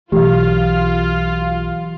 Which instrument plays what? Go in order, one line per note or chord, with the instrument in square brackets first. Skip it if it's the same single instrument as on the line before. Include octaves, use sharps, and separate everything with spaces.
[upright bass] B1 [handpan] E3 F#3 [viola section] F4 [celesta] G4